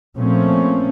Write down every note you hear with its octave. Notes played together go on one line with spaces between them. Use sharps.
A#2 F3 A3 C4 C#4